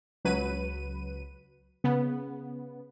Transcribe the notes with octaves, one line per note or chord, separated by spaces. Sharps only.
C#2 F#3 B4 D#7
C#3 B3